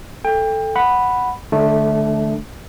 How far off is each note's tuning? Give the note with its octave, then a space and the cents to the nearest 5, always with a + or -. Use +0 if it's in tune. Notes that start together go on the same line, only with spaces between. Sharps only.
A4 +0 G5 +25
F#5 +0 B5 +0
D3 +10 A3 -20 D4 +0